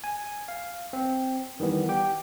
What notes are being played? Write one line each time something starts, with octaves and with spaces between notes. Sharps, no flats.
G#5
F5
C4
D#3 E3 G3 B3
G4 G5